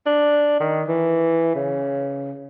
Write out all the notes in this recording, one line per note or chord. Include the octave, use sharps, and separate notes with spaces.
D4
D#3
E3
C#3